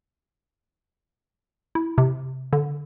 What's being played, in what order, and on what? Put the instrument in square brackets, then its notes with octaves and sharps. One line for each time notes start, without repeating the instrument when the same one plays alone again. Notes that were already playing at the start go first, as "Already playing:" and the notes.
[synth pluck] E4
C3
D3